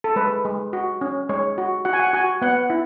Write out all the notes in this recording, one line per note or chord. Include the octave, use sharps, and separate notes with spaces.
A4
G#3 B4
G#3
F#4
C#4
G#3 C#5
F#4
F#4 F#5
G#5
F#5
F#4 G#5
B3 F#5
E4